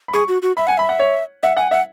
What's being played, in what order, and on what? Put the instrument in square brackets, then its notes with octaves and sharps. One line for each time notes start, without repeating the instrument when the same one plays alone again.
[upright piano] B5
[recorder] G#4 [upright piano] C#6
[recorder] F#4
F#4
[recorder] E5 [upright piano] B5
[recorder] F#5 [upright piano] G#5
[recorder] E5 [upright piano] B5
[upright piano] F#5
C#5
[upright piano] E5 [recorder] F#5
[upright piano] F#5 [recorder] G#5
[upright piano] E5 [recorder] F#5